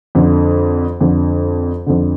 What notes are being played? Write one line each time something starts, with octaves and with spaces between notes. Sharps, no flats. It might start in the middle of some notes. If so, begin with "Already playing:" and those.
F2 D3
F2 D3
F2 D3